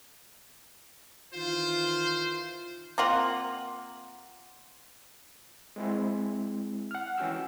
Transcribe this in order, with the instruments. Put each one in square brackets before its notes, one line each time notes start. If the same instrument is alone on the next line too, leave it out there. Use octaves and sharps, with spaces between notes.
[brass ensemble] D#3 E3 F4 [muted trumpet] C5
[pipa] A#3 C4 F4 F#5
[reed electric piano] G#3 C4 E4
F#5 F6
E3 C#4 F#4 G5 E6